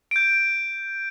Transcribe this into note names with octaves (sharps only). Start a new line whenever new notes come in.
G6 D7